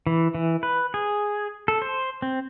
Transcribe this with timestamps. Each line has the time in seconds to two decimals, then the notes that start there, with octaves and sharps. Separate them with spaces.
0.07 E3
0.35 E3
0.63 B4
0.94 G#4
1.68 A4
1.82 C5
2.22 C4